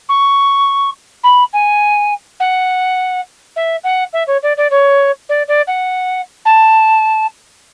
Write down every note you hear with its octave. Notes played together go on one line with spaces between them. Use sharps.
C#6
B5
G#5
F#5
E5
F#5
E5
C#5
D5
D5
C#5
D5
D5
F#5
A5